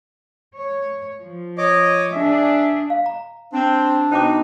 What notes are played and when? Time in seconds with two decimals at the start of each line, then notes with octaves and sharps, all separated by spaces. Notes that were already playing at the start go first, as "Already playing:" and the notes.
0.54 C#5
1.18 F3
1.58 C#5 D#5 D6
2.12 D4 G#4 E5
2.90 F5
3.06 A#5
3.53 C4 D4
4.11 B2 D#4 C5 G5 D6